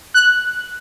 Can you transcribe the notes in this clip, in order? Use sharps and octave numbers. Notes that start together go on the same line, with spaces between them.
F#6